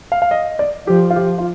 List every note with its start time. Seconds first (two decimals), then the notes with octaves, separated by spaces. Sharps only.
0.12 F5
0.22 F5
0.31 D#5
0.59 D5
0.87 F3 G4
1.10 F4
1.16 G4
1.38 F4